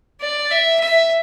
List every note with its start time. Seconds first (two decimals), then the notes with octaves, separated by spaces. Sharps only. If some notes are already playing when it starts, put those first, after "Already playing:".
0.21 D5
0.51 E5
0.80 E5